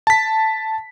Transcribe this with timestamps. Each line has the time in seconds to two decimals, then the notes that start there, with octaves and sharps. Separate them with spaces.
0.07 A5 B6